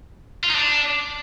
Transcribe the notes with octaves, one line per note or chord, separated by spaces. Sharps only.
F4
D#4
D4